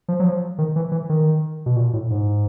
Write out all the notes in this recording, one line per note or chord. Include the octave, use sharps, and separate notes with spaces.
F3
F#3
F3
D#3
E3
E3
D#3
B2
A#2
A2
G#2